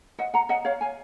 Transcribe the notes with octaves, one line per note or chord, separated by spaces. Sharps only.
D#5 F#5
F#5 A#5
D#5 F#5
C#5 F5
F5 G#5